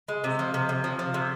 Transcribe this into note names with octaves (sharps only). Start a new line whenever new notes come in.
G#3
C3
F3
C3
C3
F3
F3
C3